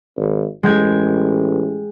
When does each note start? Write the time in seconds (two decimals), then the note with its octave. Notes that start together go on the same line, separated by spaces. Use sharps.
0.17 G#1
0.63 A1 G#3 G5 G#6